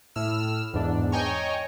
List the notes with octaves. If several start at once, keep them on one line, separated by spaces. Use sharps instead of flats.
A2 E6 F6
E2 G#2 D4
C#5 D#5 G5 G#5 A#5 C#6